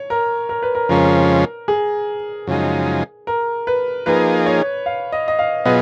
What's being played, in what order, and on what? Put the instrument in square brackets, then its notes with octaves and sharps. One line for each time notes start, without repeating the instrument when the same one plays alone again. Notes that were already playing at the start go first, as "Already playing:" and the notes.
Already playing: [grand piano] C#5
A#4
A#4
B4
A#4
[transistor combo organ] F2 C#3 F3 G#3 C#4 [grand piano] A#4
[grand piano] G#4
[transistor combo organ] F#2 C#3 F3 G#3 D#4
[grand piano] A#4
B4
[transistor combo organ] F3 A#3 D#4 G#4 [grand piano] B4
[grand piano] C#5
F5
D#5
D#5
F5
[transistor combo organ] B2 F#3 B3 F4 G#4 [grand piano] D#5